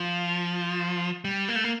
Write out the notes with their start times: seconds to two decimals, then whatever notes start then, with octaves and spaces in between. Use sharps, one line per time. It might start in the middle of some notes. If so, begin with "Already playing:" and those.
Already playing: F3
1.25 G3
1.49 A#3
1.55 A3
1.64 A#3